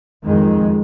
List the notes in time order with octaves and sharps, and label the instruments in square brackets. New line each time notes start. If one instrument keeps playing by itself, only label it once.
[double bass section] F2 D#3 G#3